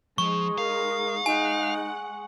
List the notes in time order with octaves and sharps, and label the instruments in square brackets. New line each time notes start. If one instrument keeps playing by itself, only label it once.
[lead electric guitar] F3 [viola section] G#3 D#4 [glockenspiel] C#6
[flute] A#4 [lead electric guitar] F5
[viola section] G#3 F#5 [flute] D#4 [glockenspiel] G#5